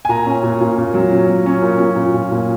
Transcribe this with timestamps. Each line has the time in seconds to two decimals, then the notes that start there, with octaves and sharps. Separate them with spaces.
0.05 G#5
0.09 A#2 A#5
0.26 C#4
0.43 A#2
0.61 A#2
0.78 A#2
0.94 F#3
1.11 C#4
1.29 F#3
1.46 C#4
1.62 A#2
1.80 A#2
1.96 A#2
2.14 A#2
2.31 A#2